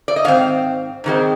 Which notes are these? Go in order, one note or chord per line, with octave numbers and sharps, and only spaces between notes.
D5
D#5
G#2 D#3 C4 F5
G#2 D#3 G#3 C4